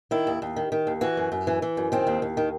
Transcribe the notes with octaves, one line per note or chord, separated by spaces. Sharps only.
D#3 E4
D#2
D#2
D#3
D#3
D#2
E3 F#4
F#2
F#2
E3
E3
F#2
D#3 C4
D#2
D#2
D#3